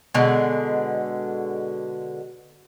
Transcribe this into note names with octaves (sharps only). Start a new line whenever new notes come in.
B2 D3 G#3